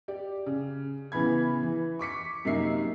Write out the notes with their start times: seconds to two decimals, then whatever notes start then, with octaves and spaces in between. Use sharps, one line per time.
0.08 G4 D5
0.46 C#3
1.12 C#3 E3 B3 B5 G#6
1.63 E3
1.99 C#6 D6 B6 C#7
2.45 F#2 C3 A#3 D#4 E5 C7